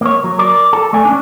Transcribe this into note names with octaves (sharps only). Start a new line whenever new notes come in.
A#3 C#5
F#3
A#4 D5
A4
A3 D5 G#5
C#4 D4